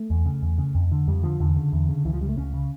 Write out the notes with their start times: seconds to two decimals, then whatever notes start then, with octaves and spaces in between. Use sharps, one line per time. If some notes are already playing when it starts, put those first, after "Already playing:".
Already playing: A3
0.10 E2
0.26 C#3
0.42 E2
0.58 C#3
0.75 F2
0.92 D3
1.08 F2 G3
1.23 D3 F3
1.40 E2 D3
1.56 C#3
1.73 E2
1.89 C#3
2.05 C#2 E3
2.13 F3
2.21 C#3 G3
2.29 A3
2.37 C#2 C#4
2.54 C#3